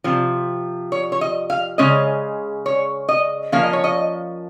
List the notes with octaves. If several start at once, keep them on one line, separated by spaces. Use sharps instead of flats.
C3 F3
C#5
C#5
D#5
F5
C#3 G#3 C#4 D#5
C#5
D#5
F3 A#3 C#4 F5
D#5
C#5
D#5